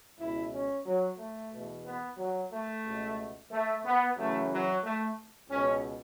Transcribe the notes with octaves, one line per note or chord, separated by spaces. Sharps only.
C#2 B2 E4
C#4
F#3
A3
E2 B2
B3
F#3
A3
C#2 B2
A3
B3
F#2 C#3 E3 A3
F#3
A3
C#2 B2 C#4